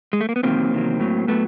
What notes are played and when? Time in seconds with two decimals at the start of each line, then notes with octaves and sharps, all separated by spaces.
0.13 G#3
0.21 A3
0.29 A#3
0.36 B3
0.43 E2 C3 D#3 F#3 A#3 C4
0.71 E2 C3 D#3 F#3
1.00 A2 F#3
1.27 A2 F#3 A3 B3